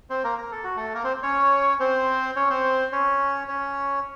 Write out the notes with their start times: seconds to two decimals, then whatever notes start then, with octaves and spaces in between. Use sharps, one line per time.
0.10 C4 C5
0.24 A#3 A#4
0.38 A#4
0.51 A4
0.64 F#4
0.76 A3 A4
0.94 A#3 A#4
1.04 C4 C5
1.23 C#4 C#5
1.80 C4 C5
2.36 C#4 C#5
2.50 C4 C5
2.92 C#4 C#5
3.48 C#4 C#5